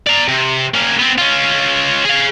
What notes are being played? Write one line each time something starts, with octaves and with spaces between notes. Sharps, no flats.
D5 A#5
C3
A#3 C#4
B3 C4
C#4 F4
G#4 F5